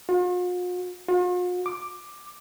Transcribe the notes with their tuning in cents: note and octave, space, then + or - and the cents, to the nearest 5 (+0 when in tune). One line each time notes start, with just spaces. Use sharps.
F4 +45
F4 +45
D6 +10